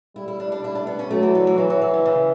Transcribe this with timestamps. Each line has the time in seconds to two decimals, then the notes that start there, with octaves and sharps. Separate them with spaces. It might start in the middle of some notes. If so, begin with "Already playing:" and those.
0.16 G3 E4
0.28 E4
0.40 D4
0.52 D4
0.64 E4
0.75 D4
0.87 B3
0.99 C#4
1.11 F#3 A3
1.23 E3
1.35 D3
1.47 E3
1.58 E3 F#3
1.70 F#3
1.82 F#3
1.94 D3
2.06 C#3